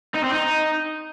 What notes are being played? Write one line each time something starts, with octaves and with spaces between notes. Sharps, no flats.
D#4
C4
D#4